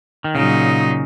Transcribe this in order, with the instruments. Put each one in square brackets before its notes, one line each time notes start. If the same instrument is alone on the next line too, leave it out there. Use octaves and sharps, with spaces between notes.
[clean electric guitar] D#3
[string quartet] A#2 F#3 D#4 [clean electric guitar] C#3